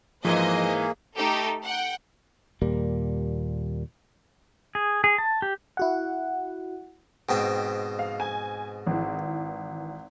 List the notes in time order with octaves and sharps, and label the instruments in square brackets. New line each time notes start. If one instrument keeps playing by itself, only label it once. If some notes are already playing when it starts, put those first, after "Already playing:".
[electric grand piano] G#2 E3 [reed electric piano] F3 [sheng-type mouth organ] A#3 G#4 [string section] C5 D#5 G#5
[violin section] A3 D#4 G4 A4
F#5 G5
[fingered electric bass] D#2 A#2 G3 A#3
[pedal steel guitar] G#4
G#4
A5
G4
[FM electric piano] E4 F#4 F#5
[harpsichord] G#2 B2 C4 [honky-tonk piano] G5
[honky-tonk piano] F5
G#5
G#1 E3